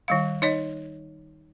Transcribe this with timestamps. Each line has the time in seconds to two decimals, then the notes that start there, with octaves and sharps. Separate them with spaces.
0.08 D#3 G3 F5
0.42 D#4 C#5 D#5